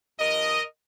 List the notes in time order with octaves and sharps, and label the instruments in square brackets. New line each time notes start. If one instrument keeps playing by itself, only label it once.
[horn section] G2 F3 A#4 D#5